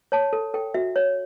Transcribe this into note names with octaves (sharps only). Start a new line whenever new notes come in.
C#5 A5
A4
A4 G5
F#4 E5
C#5